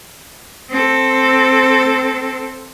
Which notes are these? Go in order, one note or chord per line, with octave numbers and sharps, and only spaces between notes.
C4 A4